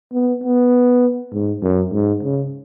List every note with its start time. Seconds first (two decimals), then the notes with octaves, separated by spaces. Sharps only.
0.13 B3
0.43 B3
1.33 G#2
1.62 F#2
1.93 G#2
2.23 C#3